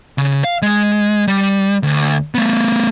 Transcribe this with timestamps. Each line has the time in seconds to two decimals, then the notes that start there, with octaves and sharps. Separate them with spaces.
0.18 C#3
0.44 F5
0.62 G#3
1.28 G3
1.83 D2
2.35 A3 B3